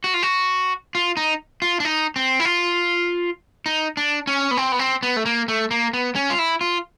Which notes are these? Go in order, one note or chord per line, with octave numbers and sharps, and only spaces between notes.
F#4
F4
F#4
F4
D#4
F4
D4
D#4
C4
E4
F4
D#4
D4
C#4
B3
C4
B3
C4
B3
A3
A#3
A3
A#3
B3
C#4
F4
E4
F4